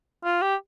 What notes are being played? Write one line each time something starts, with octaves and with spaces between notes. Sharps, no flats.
F4
G4